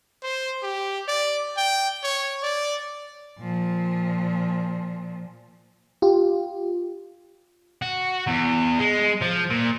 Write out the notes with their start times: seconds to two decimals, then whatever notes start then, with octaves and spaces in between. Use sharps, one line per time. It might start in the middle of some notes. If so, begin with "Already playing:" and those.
0.23 C5
0.63 G4
1.08 D5
1.57 G5
2.03 C#5
2.43 D5
3.39 A#2 F3
6.02 F4 G4
7.82 F#4
8.27 E2
8.80 G#3
9.22 F3
9.51 A#2